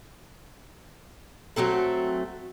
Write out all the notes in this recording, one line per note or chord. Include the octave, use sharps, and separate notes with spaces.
F#3 A3 C4 A4